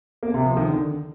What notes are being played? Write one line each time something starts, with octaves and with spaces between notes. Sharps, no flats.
A#3
C3
F3
D#3
D3